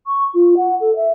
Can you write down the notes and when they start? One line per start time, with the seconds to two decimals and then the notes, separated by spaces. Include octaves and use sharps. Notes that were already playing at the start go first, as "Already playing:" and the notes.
0.07 C#6
0.34 F4
0.57 F#5
0.80 A4
0.96 E5